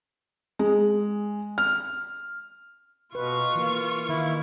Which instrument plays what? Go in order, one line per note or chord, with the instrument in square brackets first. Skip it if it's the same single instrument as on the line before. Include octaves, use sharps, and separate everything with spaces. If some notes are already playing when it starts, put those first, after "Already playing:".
[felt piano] G#3
F6
[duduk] B2 [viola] F4 C#6 [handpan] B4
[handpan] E3 [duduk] A#3
[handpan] D#3 [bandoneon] E4